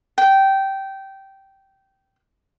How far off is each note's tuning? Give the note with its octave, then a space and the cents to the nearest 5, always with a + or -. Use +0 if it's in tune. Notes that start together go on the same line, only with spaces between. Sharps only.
G5 -15